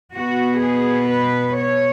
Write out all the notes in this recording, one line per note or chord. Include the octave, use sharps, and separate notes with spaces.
B2 B3 F#4
G#4
B4
C#5